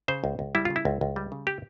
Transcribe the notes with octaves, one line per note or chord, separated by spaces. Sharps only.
C#3 C5
C#2
C#2
G3 E4
C#3 F4
E4
C#2
C#2
G3
C#3
G4